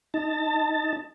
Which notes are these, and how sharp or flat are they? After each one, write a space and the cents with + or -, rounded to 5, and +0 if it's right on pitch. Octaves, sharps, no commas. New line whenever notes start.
D#4 +0 A5 +25